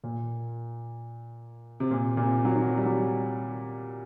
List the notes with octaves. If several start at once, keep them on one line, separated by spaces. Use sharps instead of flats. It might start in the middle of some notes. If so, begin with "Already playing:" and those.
A#2
C3
A#2
A#2
C3
F#3
D#3
G3
F#3